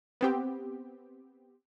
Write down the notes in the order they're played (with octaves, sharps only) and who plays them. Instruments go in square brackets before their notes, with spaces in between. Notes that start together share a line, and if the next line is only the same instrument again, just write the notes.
[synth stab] B3 C4 G4